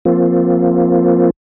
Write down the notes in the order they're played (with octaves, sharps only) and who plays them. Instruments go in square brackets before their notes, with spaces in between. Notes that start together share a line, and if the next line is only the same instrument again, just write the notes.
[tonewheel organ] F3 A#3 C4 F4